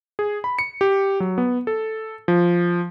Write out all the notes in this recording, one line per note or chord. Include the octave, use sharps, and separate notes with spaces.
G#4
B5
C#7
G4
F#3
B3
A4
F3